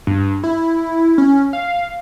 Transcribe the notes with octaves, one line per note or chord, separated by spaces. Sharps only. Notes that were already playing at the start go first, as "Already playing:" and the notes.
G2
E4
C#4
F5